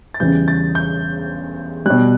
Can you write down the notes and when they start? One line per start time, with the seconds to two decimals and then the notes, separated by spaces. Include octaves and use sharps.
0.14 A6
0.20 E2 C#3 E3 G3 G6
0.48 A6
0.75 G6
1.86 B2 G3 F#6